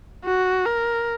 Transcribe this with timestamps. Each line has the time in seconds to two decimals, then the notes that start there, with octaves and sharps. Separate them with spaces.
0.25 F#4
0.66 A#4